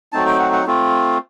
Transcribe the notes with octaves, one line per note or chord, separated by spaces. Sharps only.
F#3 A3 C4 D#4 A5
G5
F#5
F#5
A3 C4 F4